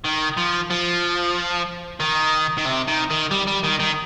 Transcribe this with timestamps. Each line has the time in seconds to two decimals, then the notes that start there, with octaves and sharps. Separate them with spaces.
0.05 D#3
0.37 F3
0.70 F3
2.00 D#3
2.58 D#3
2.66 C3
2.88 D#3
3.10 D#3
3.31 G3
3.47 G3
3.64 D#3
3.80 D#3